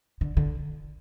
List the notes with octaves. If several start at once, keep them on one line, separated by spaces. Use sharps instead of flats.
D3
D3